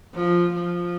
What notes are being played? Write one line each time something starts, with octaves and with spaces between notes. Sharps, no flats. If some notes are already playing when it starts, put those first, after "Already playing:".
F3
F3